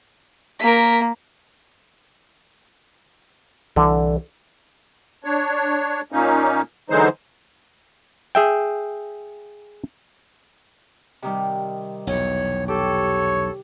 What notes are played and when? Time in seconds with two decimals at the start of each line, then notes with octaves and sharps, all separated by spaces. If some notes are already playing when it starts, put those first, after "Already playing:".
0.61 A#3 A#4 B6
3.76 C2 D3 E3
5.24 D4 C#5
6.12 A#2 A#3 C#4 D#4
6.90 D3 E3 F#3 G#3 D#4 C5
8.35 G#4 E5 G5
11.22 C3 D#3 G3
12.07 B1 E2 C#5
12.68 G4 A4 C#5